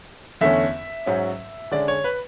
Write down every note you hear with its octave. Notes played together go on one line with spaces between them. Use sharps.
E2 D3 A3 C#4 E5
G#2 F#3 C#4
D3 G#3 C#4 D5
C#5
B4